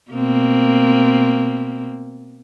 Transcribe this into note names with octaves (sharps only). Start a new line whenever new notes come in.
B2 A#3 C4